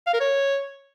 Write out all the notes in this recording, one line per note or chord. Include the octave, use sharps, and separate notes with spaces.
F5
A#4
C#5